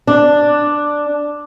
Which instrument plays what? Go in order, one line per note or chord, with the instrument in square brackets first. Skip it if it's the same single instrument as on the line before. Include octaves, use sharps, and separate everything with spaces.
[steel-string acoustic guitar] D4